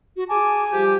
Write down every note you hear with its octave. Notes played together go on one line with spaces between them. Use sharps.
F#4
G#4 G#5 A5 D6
F3 G3 G4